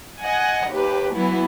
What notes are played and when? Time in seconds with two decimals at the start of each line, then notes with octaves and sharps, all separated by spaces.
0.21 D#5 F#5 G#5
0.70 D#2 G4 B4
1.14 E3 F#3 B3 E4